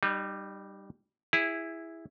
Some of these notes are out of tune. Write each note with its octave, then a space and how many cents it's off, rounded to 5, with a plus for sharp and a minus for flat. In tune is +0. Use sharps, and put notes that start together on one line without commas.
G3 +0 D#4 -35
E4 +0 G#4 -20